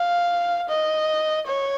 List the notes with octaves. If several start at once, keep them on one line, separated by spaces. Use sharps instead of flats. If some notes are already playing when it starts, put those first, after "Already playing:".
Already playing: F5
D#5
C#5